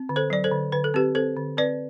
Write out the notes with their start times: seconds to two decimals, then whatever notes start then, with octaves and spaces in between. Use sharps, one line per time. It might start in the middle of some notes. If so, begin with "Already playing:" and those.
Already playing: C4
0.09 D3
0.16 A4 C5
0.30 F#3 D5
0.44 A4 C5
0.51 D3
0.72 D3 B4
0.84 A4
0.94 C4 G4 B4
1.15 C4 A4 C5
1.37 D3
1.57 C4 B4 D5